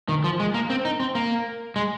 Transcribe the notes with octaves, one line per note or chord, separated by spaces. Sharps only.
D#3
F3
G#3
A#3
C4
D#4
C4
A#3
G#3